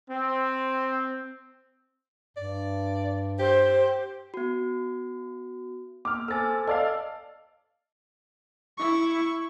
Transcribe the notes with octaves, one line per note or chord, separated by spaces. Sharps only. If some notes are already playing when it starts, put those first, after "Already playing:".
C4
G2 D5
G4 C5
B3 F#4
A#3 D6 F6
A4 C5 G#5 E6 A6
A4 D5 D#5 F5
E4 C#6